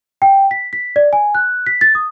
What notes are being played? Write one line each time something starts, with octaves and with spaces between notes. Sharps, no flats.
G5
B6
B6
D5
G#5
F#6
B6
A6
D#6